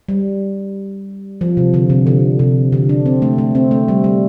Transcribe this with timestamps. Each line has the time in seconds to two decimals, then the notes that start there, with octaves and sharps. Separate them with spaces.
0.09 G3
1.41 F3
1.57 C3
1.74 D3
1.90 C3
2.07 D3
2.39 C3
2.72 D3
2.89 D4
3.06 C4
3.22 A3
3.38 A3
3.55 C4
3.71 A3
3.88 G3
4.04 G3